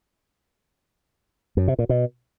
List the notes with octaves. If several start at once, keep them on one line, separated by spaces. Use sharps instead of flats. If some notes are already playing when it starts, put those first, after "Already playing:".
F#2
C3
A#2
B2